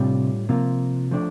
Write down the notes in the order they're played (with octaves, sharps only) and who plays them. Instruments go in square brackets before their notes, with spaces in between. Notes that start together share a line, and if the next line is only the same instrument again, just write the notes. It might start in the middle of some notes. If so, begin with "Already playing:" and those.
Already playing: [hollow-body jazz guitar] A2 G3 D4 F4 [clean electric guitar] C3
[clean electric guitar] C3 [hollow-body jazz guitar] F3 A#3 F4
[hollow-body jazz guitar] F3 A3 D4